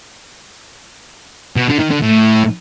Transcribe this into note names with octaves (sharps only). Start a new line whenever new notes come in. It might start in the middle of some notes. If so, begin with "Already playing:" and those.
B2
D3
D#3
D3
A2